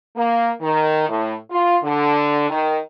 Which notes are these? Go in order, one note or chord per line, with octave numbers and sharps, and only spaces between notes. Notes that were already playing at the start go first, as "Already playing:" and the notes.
A#3
D#3
A2
F4
D3
D#3